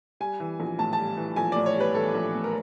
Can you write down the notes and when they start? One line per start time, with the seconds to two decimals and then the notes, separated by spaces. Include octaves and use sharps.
0.20 G3 G#5
0.40 E3
0.60 A#1
0.78 A2 A5
0.93 A5
0.98 G3
1.17 E3
1.36 A#1 G#5
1.52 A2 D5
1.66 C#5
1.76 G3 B4
1.95 E3 A4
2.15 A#1
2.34 A2
2.44 A#4